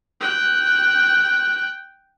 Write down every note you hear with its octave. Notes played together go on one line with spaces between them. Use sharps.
G5 F#6